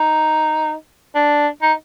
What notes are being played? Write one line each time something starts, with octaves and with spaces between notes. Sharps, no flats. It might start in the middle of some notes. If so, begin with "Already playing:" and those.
Already playing: D#4
D4
D#4